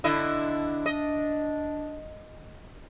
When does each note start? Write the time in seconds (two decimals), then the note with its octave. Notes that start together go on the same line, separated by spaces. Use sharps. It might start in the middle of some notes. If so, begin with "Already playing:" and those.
0.04 D3 D4 E4 D#5
0.86 D#5